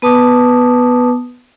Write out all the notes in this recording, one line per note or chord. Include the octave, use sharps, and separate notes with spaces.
B3 B4 A5 D6 D#6